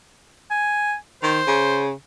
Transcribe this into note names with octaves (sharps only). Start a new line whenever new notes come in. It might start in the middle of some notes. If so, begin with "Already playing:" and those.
G#5
D#3 C5
C#3